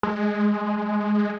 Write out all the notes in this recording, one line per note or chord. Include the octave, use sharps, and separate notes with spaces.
G#3